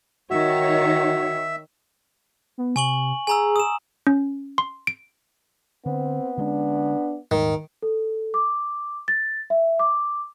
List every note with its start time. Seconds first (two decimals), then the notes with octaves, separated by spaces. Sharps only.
0.31 D#3 F#4 C#5 E5
2.58 B3
2.76 C3 G#5 C#6 F#7
3.27 G#4 G#5 A#5 E6
3.56 D#6 E7
4.07 C#4
4.58 C6
4.87 D7
5.86 D3 B3 C4
6.38 D3 G#3 C#4 D4
7.31 D#1 G#2 D#3
7.83 A4
8.34 D6
9.08 A6
9.50 E5
9.79 D6